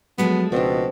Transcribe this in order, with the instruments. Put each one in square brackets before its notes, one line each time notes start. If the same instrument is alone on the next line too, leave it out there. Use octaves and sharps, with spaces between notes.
[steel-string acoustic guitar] F3 G#3 A3 [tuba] F#3 [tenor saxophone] B3
[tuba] C#2 [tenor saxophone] B2 [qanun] C4 D4